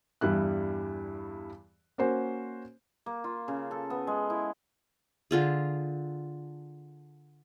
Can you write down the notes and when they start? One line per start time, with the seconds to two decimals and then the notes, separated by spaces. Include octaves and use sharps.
0.21 E2 G2 G3 E4 F#6
1.98 A#3 C#4 F#4 C5
3.06 A#3
3.24 F4
3.48 C#3
3.71 A4
3.90 B3
4.07 G#3
4.30 E4
5.31 D3 F4 G#4